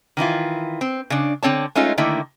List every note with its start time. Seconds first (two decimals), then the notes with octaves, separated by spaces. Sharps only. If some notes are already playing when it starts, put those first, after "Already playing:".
0.17 D#3 E3 E4 F4
0.81 C4
1.10 C#3 D4
1.43 D3 C4 C#5 A5
1.75 G#3 A3 C#4 D#4 F4
1.98 D3 D#3 A3 A#3 E4